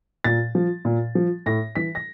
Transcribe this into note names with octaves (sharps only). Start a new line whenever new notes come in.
A#2 A6
F3
A#2
F3
A2 A#6
E3 B6
A#6